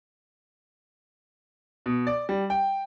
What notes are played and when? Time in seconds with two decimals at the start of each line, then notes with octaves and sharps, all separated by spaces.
1.86 B2
2.07 D5
2.29 G3
2.50 G5